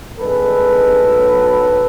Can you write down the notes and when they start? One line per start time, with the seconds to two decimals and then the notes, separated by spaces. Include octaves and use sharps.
0.19 G#1 G2 D#3 G#3 A4 B4
1.00 B1 A2 F#3